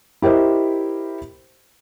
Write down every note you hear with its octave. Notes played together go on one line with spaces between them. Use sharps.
E4 G4 A#4 C5 D#5